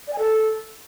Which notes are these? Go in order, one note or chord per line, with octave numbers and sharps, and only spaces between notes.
D5
G#5
A4